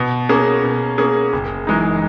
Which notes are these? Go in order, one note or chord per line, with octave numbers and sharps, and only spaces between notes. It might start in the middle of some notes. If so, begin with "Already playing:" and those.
Already playing: B2
A#3 C#4 G#4
B2
A#3 C#4 G#4
F#1
F#2 E3 G#3 D#4